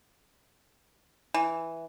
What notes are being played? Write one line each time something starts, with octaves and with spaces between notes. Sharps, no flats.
E3